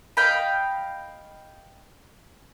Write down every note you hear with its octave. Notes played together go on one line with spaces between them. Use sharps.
D#5 F5 G5 B5